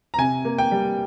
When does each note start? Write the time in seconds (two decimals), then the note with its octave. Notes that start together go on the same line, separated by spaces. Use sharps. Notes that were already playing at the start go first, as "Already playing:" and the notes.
0.14 A#5
0.18 C3 G#5
0.45 A#3
0.58 G5
0.72 G3